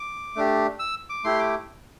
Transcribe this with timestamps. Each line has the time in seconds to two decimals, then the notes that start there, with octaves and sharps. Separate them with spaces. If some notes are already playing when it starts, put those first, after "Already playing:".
Already playing: D6
0.36 A3 D4 G4
0.79 E6
1.10 D6
1.24 A3 E4 G4 C6
1.39 D6